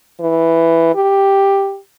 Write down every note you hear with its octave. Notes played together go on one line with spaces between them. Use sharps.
E3
G4